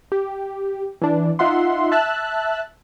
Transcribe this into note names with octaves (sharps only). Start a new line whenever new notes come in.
G4
E3 D4
D#4 F4 E5 F#5 C6
E5 A5 E6 F#6